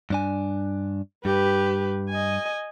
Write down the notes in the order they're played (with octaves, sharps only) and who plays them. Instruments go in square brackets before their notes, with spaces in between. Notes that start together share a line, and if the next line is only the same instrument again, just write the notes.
[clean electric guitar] G2 D4 G#5
[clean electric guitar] G2 [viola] G4 B4
[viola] D#5 G#5